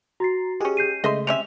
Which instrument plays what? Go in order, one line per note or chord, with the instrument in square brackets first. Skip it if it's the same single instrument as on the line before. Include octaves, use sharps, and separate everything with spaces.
[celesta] F#4 A6 C7 [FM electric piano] A#5
[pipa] G#3 C#4 [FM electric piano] G4 G#4
[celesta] G6 C7 D#7
[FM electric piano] C#3 G#3 A3 [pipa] D#5 E5 C6
[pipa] C3 C#4 E5 [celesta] F7